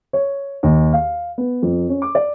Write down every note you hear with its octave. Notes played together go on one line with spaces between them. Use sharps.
C#5
D#2
F5
B3
F2
C#4
D6
D5